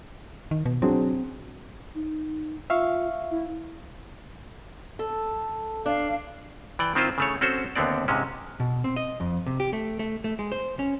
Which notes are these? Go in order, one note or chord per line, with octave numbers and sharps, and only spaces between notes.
D#3
B2
F#3 C4 D4 G#4
D#4
F4 E5 F5 C#6
E4
A4
D4 F5
E3 D5 G5
D#3 C4 E4 F4 C5
C#3 A3 C#5
C4 C#4 F#4 A4 C5
D#2 D3 B3 C4 D5
G#2 C3 G#3 C#4
B2
C4
D#5
F2
C3
G4
A3
A3
A3
G#3
C5
C#4